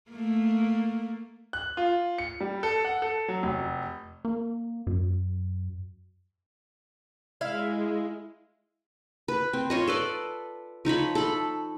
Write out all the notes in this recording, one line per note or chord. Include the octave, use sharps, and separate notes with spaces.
A3 A#3
F#6
F4
C#7
G3
A4
F#5
A4
F#3
F1
A#3
F#2
G#3 E4 E5 F5
B4
C4
F4 C#5 D#5
A4 B4 D5
F3 D#4 C#5 B5
A4 B5